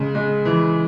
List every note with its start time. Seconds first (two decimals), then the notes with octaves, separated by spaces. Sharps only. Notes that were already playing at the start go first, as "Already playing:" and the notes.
Already playing: C#3 G#3
0.15 G#3
0.45 E3